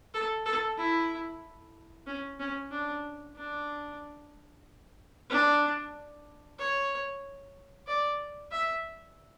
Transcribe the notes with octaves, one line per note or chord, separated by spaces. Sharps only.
A4
A4
E4
C#4
C#4
D4
D4
D4
C#5
D5
E5